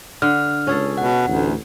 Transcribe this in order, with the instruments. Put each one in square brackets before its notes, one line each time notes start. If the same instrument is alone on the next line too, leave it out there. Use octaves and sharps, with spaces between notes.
[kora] D3 [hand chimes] F6
[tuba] C#2 [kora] C#4 G#4 A4
[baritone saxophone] B2 [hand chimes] F#5
[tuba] A1 [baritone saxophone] D2